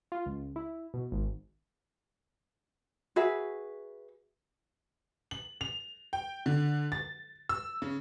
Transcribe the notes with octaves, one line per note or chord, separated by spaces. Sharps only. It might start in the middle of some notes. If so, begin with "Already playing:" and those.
F4
C#2
E4
B2
G#1
F#4 G#4 B4 E5
F#7
F7
G5
D3
A6
E6
C#3